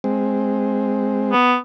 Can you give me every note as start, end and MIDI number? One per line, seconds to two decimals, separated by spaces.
0.04 1.34 56
0.04 1.34 60
1.32 1.56 59